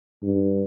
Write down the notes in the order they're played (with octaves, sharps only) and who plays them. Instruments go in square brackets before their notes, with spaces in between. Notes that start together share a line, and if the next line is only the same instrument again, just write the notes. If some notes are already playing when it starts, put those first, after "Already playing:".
[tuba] G2